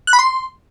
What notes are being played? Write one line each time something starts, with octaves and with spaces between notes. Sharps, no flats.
F#6
B5
C6